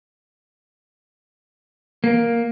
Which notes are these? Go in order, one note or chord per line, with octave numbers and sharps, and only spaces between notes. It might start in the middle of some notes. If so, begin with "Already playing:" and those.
A#3